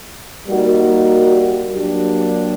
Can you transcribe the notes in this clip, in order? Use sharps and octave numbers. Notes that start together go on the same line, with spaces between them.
G3 A#3 D#4 F#4 A#4
F#3 A#3 D4 G4